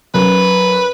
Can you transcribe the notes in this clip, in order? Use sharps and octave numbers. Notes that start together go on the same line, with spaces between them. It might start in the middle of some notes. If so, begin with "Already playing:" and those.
F#2 B4